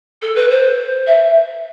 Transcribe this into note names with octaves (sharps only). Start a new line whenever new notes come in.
A4
B4
C5
E5